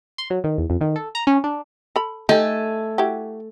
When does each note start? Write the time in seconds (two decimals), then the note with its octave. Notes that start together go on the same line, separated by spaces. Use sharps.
0.18 C6
0.30 F#3
0.44 D#3
0.58 E2
0.70 F2
0.81 D#3
0.96 A4
1.15 A#5
1.27 C#4
1.44 D4
1.96 A4 B5
2.29 A3 D#4 G4 A4 G#5
2.98 E4 F#4 G4